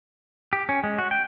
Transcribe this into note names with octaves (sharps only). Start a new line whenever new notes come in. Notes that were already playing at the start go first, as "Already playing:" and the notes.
G4
C#4
G#3
F#4
G5